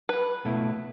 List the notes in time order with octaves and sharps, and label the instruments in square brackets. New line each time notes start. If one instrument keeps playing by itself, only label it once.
[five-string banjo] B4
[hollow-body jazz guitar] B2 A3 E4